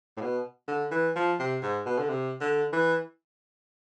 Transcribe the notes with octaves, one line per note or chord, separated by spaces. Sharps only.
A2
B2
D3
E3
F3
C3
G#2
B2
D3
C3
D3
E3